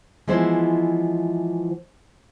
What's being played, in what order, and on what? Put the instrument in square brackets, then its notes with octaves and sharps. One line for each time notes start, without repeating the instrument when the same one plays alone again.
[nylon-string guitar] E3 F3 G#3 B3 E4 C5